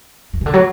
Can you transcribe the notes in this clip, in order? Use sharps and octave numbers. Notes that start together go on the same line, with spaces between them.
E3
C#3
D3
F#3